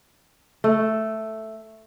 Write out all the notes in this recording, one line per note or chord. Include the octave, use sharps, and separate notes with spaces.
A3